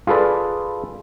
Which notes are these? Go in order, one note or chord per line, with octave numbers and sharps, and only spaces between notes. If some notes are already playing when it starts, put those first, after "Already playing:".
F4 G#4 A4 B4 D5